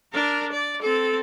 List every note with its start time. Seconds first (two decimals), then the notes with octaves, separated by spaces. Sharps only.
0.12 D4 A#4
0.52 D5
0.81 C4 A4